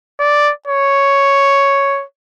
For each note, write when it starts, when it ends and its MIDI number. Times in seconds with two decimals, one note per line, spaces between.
0.20 0.52 74
0.68 2.04 73